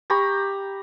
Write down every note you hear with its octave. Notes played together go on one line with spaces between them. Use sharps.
G4 A#5 B5 C#6